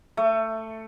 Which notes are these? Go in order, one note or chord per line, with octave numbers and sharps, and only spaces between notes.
A3